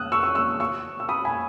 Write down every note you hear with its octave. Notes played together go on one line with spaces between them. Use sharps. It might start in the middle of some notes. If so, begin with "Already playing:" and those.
Already playing: D#6 E6 F#6
C#6 E6
C#6 E6
C#6 E6
C#6 E6
E6
B5 D#6
G#5 B5